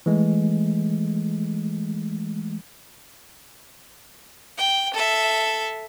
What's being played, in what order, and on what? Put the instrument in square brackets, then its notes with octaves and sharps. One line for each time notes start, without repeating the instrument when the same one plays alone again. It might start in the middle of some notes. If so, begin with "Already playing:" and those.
[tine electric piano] E3 G#3 A3
[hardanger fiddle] G5
A4 E5